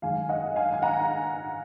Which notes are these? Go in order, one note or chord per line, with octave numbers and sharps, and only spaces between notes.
F#2 D#3 G#3 F5 G#5
D#5 F#5
F5 G#5
G#5
F#5 A#5